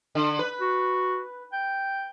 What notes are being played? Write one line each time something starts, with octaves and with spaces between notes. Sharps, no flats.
D3
B4
F#4
G5